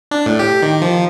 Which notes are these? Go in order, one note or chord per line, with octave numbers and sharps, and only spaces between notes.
D4
A2
G4
D#3
F3